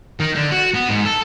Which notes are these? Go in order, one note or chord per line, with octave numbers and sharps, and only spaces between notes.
D#3
D3
F#4
B3
G#2
A4